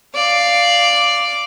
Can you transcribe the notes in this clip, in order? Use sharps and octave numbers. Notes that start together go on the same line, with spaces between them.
D5 F5